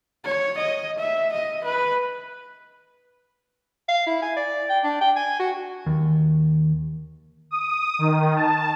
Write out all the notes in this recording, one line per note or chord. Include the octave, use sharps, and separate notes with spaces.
C#5
D#5
E5
D#5
B4
F5
E4
G#5
D5
G5
D4
G5
G#5
F#4
D#2
D#6
D#3
A5